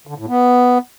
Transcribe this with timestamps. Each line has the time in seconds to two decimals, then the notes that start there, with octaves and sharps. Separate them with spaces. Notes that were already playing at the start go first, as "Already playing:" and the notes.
0.07 D3
0.18 A2
0.29 B3